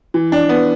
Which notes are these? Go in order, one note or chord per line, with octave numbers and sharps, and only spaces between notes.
E3
D4
B3